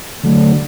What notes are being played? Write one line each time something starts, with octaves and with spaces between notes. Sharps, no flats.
D3 F#3 A3